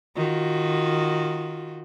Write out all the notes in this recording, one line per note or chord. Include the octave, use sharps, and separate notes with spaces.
D#3 F4 F#4